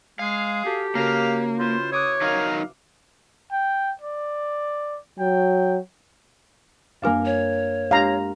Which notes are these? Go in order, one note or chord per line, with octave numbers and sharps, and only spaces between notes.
G#3 G#4 F5
F#4 G4 A4
C#3 A#3 F#4 A#4 F5
C#4 E4 F4 B4 C5
C#5 E5 D6 D#6 F#6
F#3 D#4 A#4 F5
G5
D5
F#3 G5
F#2 A#3 D4 A#4 F5 G#5
C#5
G#3 D4 G4 F5 A#5